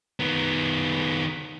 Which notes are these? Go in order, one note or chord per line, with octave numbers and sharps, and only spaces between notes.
D#3 B3